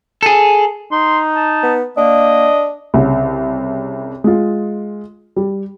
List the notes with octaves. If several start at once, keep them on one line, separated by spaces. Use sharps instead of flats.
G#4 A4
D#4 C6
A5
B3
A#3 D4 D#5
C2 C#3
G#3 F4
G3